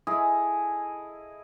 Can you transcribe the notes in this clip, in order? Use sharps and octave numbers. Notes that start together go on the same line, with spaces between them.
E4 G#4 A4 D#5